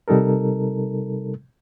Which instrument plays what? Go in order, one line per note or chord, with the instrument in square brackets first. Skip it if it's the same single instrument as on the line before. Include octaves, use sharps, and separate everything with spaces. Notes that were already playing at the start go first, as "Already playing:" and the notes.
[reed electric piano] C3 G3 D#4 A4 A#4